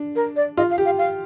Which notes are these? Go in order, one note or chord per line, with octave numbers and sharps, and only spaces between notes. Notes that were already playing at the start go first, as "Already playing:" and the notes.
Already playing: D4
A#4
D5
F4 D#5
F5
G4
F5
F5